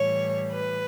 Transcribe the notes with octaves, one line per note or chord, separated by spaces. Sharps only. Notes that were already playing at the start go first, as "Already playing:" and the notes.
Already playing: A2 E3 G3 C#5
B4